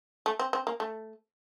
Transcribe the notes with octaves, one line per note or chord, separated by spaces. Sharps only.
A3
C4
C4
A#3
A3